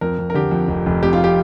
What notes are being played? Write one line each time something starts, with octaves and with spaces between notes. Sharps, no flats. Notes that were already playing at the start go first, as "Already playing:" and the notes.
F2 A#4
F2
A#4
D3 G4
F2
F1
F1
F2 G4
F4
G4